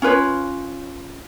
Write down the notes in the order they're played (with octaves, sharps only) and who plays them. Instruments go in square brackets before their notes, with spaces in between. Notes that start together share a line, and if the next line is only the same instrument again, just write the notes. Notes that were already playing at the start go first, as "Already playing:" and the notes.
[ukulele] C#4 F4 B4 C#5